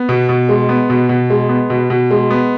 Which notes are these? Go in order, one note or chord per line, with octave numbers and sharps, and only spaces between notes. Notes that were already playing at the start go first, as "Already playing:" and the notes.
Already playing: B3
B2
B2
G#3
B3
B2
B2
G#3
B3
B2
B2
G#3
B3